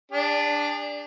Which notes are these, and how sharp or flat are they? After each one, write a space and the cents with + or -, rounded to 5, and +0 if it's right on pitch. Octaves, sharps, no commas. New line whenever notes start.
D4 +0 G#4 -45